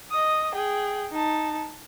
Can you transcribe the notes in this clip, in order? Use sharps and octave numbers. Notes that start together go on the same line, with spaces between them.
D#5 D#6
G#4 G5
D#4 A5